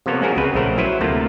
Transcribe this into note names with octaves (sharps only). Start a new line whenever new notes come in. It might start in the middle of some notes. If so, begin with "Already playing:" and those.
C3 F3 A#3 B3 A4 C#5
G#3 C4 C#4 F#4 G#4 A#4
C#2 C#3 C4 B4
A#1 C#3 A3 A#4 C5 F#5
F#3 E4 B4 C5
D2 C3 A3 A#3 F4